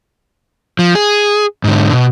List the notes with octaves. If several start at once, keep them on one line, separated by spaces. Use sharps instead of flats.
F3
G#4
G#2 D3
B2